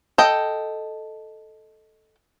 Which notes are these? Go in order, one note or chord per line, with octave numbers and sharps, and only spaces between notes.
A4 D#5 G5